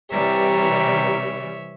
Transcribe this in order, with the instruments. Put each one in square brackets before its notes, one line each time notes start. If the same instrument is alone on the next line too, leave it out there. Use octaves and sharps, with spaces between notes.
[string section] C3 E3 G3 [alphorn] G4 [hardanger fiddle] C#5 E5 [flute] A#5